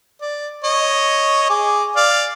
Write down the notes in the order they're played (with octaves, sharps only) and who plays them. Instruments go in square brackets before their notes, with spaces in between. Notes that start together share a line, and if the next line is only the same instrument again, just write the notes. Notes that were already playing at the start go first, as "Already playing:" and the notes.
[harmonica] D5
C#5 D#5
G#4 D6
D5 F5